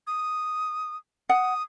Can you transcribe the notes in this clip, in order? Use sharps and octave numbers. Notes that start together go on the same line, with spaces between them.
D#6
F#5 D#6